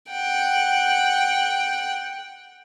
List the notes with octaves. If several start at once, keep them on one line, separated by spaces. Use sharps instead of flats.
F#5 G5